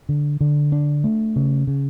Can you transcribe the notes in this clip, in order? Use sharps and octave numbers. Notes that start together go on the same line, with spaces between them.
D3
D3
D4
A3
C#3
C#3